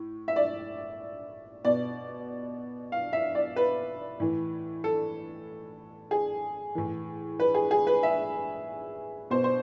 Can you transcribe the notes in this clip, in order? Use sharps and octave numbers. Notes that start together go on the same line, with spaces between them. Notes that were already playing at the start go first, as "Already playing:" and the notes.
Already playing: A2
E5
D5
B2 D5
F5
E5
D5
B4
A2 E3
A4
G#4
A2 E3
B4
G#4
G#4
B4
E5
B2 C5
C5